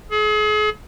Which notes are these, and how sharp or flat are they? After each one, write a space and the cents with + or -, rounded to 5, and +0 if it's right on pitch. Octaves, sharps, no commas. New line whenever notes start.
G#4 +40